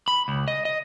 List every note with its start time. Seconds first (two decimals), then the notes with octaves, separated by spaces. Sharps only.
0.08 B5
0.28 C#2
0.48 D#5
0.65 D#5